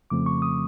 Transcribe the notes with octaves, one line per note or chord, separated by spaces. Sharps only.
F2 C#3 F3 A3 C4 D6
C#6
D#6